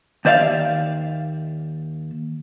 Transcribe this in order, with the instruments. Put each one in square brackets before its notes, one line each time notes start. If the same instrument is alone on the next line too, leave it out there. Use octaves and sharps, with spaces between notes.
[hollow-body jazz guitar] D#2 C5 D5 E5 F5